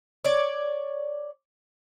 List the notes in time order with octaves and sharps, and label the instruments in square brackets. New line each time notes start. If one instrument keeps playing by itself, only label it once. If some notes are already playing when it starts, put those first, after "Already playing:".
[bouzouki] C#5 D5